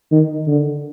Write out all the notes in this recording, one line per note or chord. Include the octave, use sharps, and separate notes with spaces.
D#3
D3